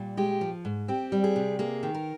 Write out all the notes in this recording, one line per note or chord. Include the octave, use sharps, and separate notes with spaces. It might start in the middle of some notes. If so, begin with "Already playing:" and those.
Already playing: A#2 G3
G#3 G4
F3
G#2
C4 G4
G3
G#4
C3
A#3 G#4
D#3
A#4